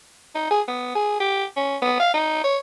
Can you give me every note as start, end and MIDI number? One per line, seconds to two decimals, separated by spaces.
0.35 0.49 63
0.51 0.61 68
0.68 0.93 59
0.95 1.17 68
1.20 1.44 67
1.57 1.77 61
1.82 1.95 59
2.00 2.14 77
2.14 2.41 63
2.44 2.58 73